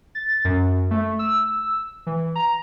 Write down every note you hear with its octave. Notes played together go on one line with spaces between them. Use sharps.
A6
F#2
A3
E6
E3
A#5